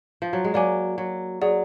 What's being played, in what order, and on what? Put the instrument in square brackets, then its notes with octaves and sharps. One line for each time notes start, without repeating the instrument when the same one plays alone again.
[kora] F3
F#3
G#3
[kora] F#3 A#3 [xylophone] D5 G#5 D6
[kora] F#3
[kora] F#3 [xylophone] G#4 D5 F#5